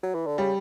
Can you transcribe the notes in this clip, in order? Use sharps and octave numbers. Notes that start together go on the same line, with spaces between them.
F#3
E3
D3
C#3 G3